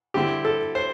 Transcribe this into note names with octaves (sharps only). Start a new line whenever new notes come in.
D3 G3 C4 E4 G4
A4
C5